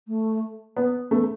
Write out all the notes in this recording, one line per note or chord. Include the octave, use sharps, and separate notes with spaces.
A3
B3
A3 B3